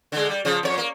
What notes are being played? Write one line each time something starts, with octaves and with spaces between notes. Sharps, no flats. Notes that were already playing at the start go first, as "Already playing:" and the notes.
D3 G#3
G3
C#3 F3
F2 C#5
A#3